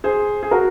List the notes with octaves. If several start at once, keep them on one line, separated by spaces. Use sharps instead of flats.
G#4 C5
G#4
F#4 A#4